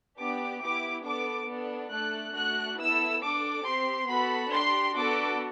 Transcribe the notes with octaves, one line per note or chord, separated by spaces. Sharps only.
B3 D4 G4 D6
B3 E4 G4 D6
B3 D4 A4 D6
B3 D4 A4
A3 D4 A4 F#6
A3 D4 F#4 F#6
B3 E4 A4 E6
D4 A4 D6
C4 G4 C6
B3 F#4 A4 B5
D4 G4 C6
B3 D4 F#4 A4 D6